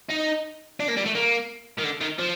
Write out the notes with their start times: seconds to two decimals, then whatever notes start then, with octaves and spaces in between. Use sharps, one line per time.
0.10 D#4
0.80 D4
0.88 A#3
0.97 G3
1.06 A3
1.15 A#3
1.79 D#3
1.84 D3
2.01 D#3
2.19 F3